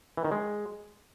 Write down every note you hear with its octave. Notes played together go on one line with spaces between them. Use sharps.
E3
D#3
G#3